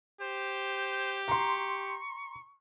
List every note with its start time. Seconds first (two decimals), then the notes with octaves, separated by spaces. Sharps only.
0.21 G4 C5
1.28 A#5 C6 C#6